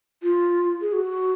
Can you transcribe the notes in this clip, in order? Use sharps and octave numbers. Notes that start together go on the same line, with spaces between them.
F4
G#4
F#4